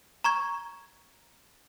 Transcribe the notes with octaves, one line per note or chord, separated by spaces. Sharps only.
A#5 C#6 G#6